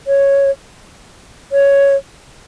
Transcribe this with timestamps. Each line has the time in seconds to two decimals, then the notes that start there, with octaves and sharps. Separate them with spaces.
0.07 C#5
1.52 C#5